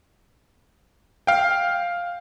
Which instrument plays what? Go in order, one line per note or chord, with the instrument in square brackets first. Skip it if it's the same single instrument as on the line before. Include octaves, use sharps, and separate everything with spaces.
[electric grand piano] F5 G5